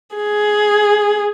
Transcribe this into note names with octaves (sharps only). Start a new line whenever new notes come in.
G#4